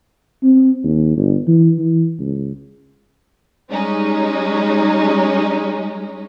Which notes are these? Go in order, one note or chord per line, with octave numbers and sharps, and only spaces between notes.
C4
D#2
G1
E3
E3
C#2
G3 G#3 C#4 D#4